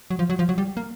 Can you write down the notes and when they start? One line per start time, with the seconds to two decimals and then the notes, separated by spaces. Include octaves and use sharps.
0.10 F#3
0.19 F3
0.30 F#3
0.39 F3
0.49 F#3
0.58 G3
0.77 A#3